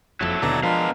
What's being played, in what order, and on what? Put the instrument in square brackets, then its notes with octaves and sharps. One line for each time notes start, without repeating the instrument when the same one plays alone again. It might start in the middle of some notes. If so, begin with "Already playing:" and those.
[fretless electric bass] F#1 F2 [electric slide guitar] F#3 E4 A4
[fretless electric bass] D#2 B2 D3 [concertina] D5 A#5
[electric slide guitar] B2 B4 F5 [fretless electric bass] F3 [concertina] G#3 D4 A#4